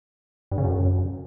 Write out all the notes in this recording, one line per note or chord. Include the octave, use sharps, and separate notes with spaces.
G2
C#3
F#2